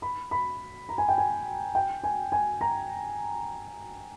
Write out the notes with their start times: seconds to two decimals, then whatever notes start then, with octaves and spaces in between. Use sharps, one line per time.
0.02 B5
0.31 B5
0.89 A#5
0.98 G#5
1.09 G5
1.18 G#5
1.75 G5
2.04 G#5
2.32 G#5
2.61 A#5